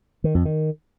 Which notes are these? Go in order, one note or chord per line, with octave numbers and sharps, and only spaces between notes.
D#3
F2
D#3